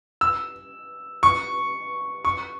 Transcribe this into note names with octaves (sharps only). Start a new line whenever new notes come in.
E6
C#6
C#6